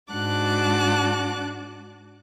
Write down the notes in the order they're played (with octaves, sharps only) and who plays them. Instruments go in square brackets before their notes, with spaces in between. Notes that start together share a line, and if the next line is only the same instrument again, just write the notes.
[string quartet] G#2 D4 F#4 A5 D6 F#6